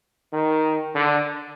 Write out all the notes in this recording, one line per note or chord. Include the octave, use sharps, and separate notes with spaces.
D#3
D3